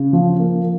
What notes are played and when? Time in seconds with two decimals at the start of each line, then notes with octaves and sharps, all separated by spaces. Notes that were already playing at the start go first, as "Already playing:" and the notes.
Already playing: C#3
0.13 F3
0.39 A#3